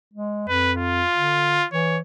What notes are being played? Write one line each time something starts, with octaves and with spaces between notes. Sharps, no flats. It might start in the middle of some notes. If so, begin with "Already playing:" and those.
G#3
F2 B4
F4
D3
E3 C#5